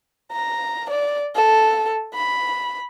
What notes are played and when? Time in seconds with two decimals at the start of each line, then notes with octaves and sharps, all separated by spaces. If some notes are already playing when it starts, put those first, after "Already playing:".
0.32 A#5
0.90 D5
1.35 A4
2.14 B5